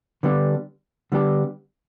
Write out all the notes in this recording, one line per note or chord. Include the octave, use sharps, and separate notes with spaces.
D3 G3 B3 D4 G4
D3 G3 B3 D4 G4